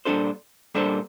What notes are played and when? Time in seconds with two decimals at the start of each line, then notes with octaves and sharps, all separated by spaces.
0.05 A#2 G3 D4 A4 C5
0.75 A#2 G3 D4 A4 C5